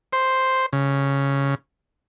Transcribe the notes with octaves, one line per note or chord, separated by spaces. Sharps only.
C5
C#3